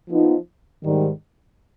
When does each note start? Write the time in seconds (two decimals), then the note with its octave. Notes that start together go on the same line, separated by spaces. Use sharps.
0.09 F3 B3 D#4
0.84 G#2 D#3 G3